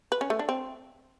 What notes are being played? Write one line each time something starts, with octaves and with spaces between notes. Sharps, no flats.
B4
C#4
A3
D4
C4